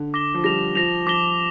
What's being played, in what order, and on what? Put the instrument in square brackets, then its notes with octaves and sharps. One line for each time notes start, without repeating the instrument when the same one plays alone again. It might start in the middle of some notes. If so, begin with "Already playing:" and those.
Already playing: [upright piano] D3
[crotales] D6 A#6 G7
[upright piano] F3
[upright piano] G3 [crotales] A#6 F7
[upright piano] F3 [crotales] A#6 F7
[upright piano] F3 [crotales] D6 A#6 G7